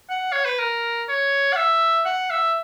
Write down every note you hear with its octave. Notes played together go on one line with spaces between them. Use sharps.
F#5
C#5
B4
A#4
C#5
F#5
E5
F#5
E5